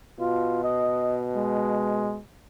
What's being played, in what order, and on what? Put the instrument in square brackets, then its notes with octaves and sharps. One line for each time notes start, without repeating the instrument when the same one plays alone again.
[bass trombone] B2 [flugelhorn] F4
[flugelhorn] D#5
G#3